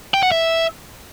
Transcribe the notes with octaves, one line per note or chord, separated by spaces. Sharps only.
G5
F#5
E5